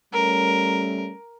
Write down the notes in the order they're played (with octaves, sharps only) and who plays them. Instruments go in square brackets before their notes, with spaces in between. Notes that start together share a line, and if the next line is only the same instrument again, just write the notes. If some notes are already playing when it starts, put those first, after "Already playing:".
[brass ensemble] G3 A3 C#4 [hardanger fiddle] A#4